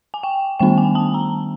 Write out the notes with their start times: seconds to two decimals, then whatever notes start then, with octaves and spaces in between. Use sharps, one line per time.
0.14 G#5
0.23 G5
0.59 D#3 G3 B3 D4 G5
0.78 G#5
0.95 A5
1.14 A#5